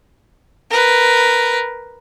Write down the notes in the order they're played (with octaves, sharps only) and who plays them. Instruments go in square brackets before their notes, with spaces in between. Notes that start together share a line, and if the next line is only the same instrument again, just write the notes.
[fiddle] A#4 B4